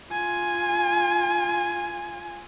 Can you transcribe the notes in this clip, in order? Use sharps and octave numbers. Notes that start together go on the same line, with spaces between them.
F4 G#5